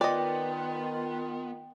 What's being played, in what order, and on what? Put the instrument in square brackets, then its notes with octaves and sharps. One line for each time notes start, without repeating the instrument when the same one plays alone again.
[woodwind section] D#3 F4 [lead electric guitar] B3 [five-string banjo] D5 D#5 [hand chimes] G5